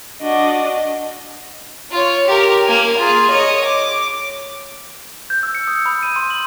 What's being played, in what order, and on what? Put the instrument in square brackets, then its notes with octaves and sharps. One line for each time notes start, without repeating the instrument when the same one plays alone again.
[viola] D4 [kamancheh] F#4 D#5
[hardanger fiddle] F4 C#5
G4 A#4
A#3 G#5
F4 G#4
C#5 D#5
D6
[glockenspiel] G6
E6
C#7
D#6
B5
D#7
C6
F#7